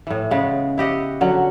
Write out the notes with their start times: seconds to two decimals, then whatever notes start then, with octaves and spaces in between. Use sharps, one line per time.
0.07 A2 E3
0.30 C#3 G#3 B3
0.78 E4 G4 D#5 F#5
1.21 D3 F#3 C#4